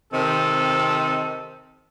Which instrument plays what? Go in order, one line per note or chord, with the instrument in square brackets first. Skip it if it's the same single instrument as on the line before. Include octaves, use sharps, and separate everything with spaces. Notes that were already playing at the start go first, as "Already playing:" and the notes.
[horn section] C3 D#3 C4 A4